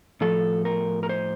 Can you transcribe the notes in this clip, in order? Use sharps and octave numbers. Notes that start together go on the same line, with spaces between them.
A2 F3 A4
A#4
A#4
C5